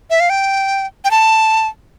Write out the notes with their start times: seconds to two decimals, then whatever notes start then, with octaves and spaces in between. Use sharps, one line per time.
0.10 E5
0.20 F5
0.30 G5
1.05 G5
1.11 A5